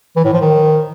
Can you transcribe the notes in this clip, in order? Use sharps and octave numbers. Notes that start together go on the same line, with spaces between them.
E3
A2
F3
D#3